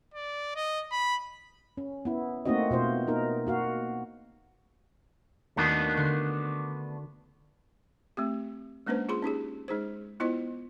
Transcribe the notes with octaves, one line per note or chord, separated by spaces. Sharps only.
D5
D#5
B5
C#4
B3 E4
A3 A#3 C4 D#4 F#4 D#5
B2 F4 C5
A#3 D#4 A#4
A#3 F#4 F5
D#2 A3 B3 D4 F#4 D#6
D3 C6
A3 C4 G4
G#3 A#3 C#4 D4 B4 C5
F4 G#4 B5 C6
C#4 D#4 G4 G#4
G#3 D#4 G#4 C5
B3 E4 F4 C5 D#5